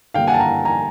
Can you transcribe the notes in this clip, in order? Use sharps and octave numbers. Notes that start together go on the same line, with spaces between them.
D3 G3 A#3 F5 G5
F#5 G#5
A5
G#5 A#5
G#5 A#5